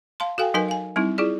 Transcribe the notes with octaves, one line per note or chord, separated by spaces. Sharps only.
F5 A5 C6
F#4 A4 F5 G5 G#5
F#3 D#4 A#4 B4 D#5 G#5
F5 G#5
G3 C4 D#4 E4
E4 F4 G#4 D5